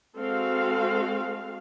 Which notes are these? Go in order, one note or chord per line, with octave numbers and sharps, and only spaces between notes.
G#3 C4 F#4 A4 F5